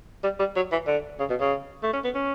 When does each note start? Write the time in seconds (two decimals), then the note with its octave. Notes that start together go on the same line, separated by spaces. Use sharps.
0.24 G3
0.39 G3
0.56 F#3
0.72 E3
0.87 D3
1.19 C#3
1.30 B2
1.40 C#3
1.83 A3
1.93 C#4
2.04 B3
2.15 C#4